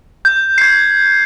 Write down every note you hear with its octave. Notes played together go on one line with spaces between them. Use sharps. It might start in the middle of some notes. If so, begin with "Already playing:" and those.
G6
G#6 C7